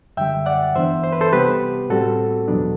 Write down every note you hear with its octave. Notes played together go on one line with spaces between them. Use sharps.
F#2 D3 G3 E5 G5
D5 F#5
G2 E3 B3 D4 C5 E5
C5
B4
A4 C5
C3 G3 B3 G4 B4
A2 G3 C4 F#4 A4
E2 B2 F#3 B3 D4